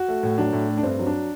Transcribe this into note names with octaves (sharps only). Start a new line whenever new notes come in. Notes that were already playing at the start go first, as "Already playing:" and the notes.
Already playing: F#4
A3
A2
F#3 D4
A2
A3
D4
G2 C4
F#3
D4